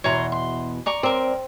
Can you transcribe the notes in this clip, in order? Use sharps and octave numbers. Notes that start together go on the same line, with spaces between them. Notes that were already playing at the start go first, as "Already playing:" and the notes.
E2 B2 C#5 A#5 C6
C6
D5 A#5 C#6
C4 A#4 D5